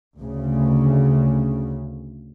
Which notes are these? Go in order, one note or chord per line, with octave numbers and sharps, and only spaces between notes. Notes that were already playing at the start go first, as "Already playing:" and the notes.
D2 C#3